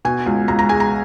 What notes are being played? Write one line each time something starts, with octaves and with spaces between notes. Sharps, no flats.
B2 G#5
C#2
C#2 A#5
A#5
G#3 G#5
A#5